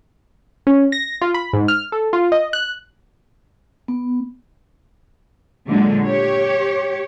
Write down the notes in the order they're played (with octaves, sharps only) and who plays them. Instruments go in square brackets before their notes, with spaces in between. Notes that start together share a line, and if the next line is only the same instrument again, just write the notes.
[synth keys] C#4
A#6
F4
B5
G#2
F6
A4
F4
D#5
F#6
[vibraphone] B3
[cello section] A#2 D3 F#3 G#3
G4 C#5